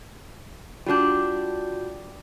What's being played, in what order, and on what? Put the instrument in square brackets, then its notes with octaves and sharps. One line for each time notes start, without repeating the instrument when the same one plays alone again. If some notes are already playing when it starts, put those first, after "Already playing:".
[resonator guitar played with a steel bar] G3 D4 [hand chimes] F4 F#4 G6